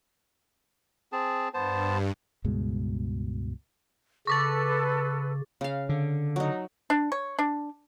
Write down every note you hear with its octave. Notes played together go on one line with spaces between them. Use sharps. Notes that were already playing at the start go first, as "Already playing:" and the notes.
C4 G#4 A5
G2 B3 C5 A5
C#2 G2 B2 G#3
C#3 A4 B4 C#6 D6 A6
C#3 F5
D3
F#3 D#4
D4
C#5
D4